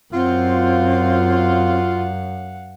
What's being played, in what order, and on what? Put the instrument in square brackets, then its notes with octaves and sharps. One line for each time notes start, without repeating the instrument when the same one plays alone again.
[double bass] F#2 [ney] C4 [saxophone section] F4 [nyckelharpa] F5 F#5